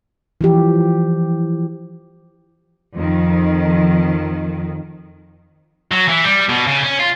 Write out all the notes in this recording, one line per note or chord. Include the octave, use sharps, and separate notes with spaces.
E3 F3 G4
F2 D#3
F#3
E3
G3
B2
C#3
C#4
F4